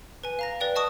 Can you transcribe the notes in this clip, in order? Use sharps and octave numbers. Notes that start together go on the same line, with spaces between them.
B4 G#5
F5 A#5 A#6
B4 D5 G5
D#5 A5 C#6 D#6